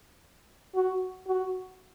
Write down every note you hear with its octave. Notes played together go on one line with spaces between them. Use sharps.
F#4
F#4